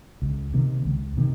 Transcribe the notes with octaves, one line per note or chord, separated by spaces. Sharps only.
C#2
C3 D#3 A#3
C#2
C3 D#3 A#3